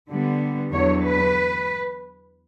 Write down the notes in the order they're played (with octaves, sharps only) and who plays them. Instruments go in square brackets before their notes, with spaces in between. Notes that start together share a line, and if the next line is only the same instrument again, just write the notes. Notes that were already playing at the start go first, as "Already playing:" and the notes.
[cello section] D3 G3 B3
E2 D3 F#3 C#5
B4